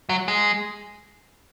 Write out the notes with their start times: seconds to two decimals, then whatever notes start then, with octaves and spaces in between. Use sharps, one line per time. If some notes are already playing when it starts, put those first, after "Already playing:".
0.09 F#3
0.28 G#3